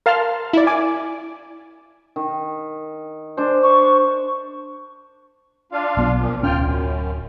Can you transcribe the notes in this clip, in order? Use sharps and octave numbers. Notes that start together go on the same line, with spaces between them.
A#4 F5 A5 C6 F6
E4 D5
G#5 D6
D#3
D4 C5
C#6
D4 F4 F5
B1 B3
A#2 F3
D1 C#4 F4 G5 F6
F#2